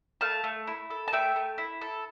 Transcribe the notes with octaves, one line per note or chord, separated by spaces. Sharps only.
A3 F5 A5
A3
E4
A4
A5
A3 E5 G5
A3
E4
A4